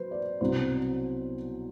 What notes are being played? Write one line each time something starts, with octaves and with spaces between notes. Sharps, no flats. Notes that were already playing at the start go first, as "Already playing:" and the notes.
Already playing: F#3 B4 C5
D5
C2 B2 F#3 C4 C5